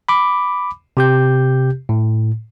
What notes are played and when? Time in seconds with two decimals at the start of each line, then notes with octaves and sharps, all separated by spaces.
0.09 B5 D6
0.97 C3 G4 G6
1.89 A2